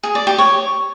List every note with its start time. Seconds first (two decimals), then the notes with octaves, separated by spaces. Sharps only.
0.03 G#4
0.15 D5
0.27 G4
0.38 C#5